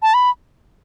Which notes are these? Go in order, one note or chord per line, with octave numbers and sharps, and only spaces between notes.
A5
B5